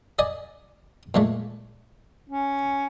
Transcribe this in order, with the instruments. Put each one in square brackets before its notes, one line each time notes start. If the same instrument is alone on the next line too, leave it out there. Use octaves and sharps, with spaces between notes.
[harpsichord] D5 D#5 G#5
A#2 G#3 A3
[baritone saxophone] C#4